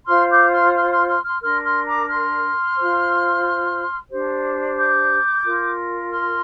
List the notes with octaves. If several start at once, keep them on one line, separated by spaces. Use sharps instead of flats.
F4 C5 C6 F6
D6 G6
C6 F6
C6 F6
C6 F6
C6 F6
C6 F6
D4 A#4 C6 F6
C6 F6
A#5 D6
C6 F6
F4 C5
D4 G4 C5
D6 G6
F4 A#4
C6 F6